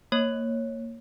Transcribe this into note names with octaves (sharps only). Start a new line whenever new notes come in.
A#3 C#5